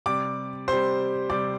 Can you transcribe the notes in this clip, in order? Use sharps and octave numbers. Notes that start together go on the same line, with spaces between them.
C3 G3 D5 D6
C3 G3 C5 C6
C3 G3 D5 D6